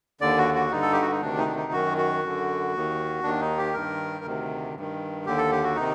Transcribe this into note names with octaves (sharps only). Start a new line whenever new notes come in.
D#2 D3 D5
F#4
F#4
G2 D3 D#4
A4
G4
F#4
D#4
D2 C3 D#3 D4
D#4
D4
D#4
F#2 D#3 F#4
F#4
F#2 D3
D#2 D#3
D#2 D#3 D4
D#4
G4
G2 D#3 A#4
D2 C3 D#3
G2 D#3
D#2 D3 G4
A4
G4
F#4
C3 D#3 D#4